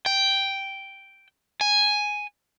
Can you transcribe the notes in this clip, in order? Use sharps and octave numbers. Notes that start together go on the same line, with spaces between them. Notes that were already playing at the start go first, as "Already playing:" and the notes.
G5
G#5